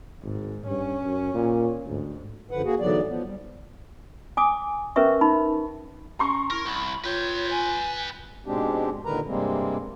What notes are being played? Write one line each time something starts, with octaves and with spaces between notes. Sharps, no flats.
G#1 G#2
G2 C#4
F#2
A#2
D2 G#2
F#2 D3 F3 B4 F#5
A#3 F#4 G#4
G#2 D3 E3 F#3 B3 D5
F3 B3
G3
G#5 D6 D#6
C#4 A#4 B4 E5 C#6
D#4 B5
C#4 A#5 C6 C#6
E4 A#4
C2 B5
F4 B4 C#5 G5
G#5
G#2 B2 G#3 C4 D4 G4
A#2 D3 D#3 A#4 B4 A#5
G2 C3 G3 G#3 A#3 C4